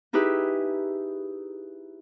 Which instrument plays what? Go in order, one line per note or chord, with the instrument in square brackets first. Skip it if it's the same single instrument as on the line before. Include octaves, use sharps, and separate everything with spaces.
[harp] D#4 E4 G4 G#4 B4